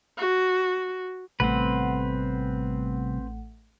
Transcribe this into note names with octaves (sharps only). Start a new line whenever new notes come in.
F#4
A1 C3 G3 A3 B3 C4 B4 F#5